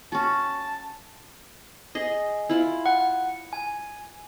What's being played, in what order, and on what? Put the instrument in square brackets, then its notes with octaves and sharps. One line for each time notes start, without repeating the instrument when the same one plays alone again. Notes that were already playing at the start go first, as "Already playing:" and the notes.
[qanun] C#4 F#4 [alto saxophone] A5
[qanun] G#4 D#5
E4 F4
[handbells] F#5
G#5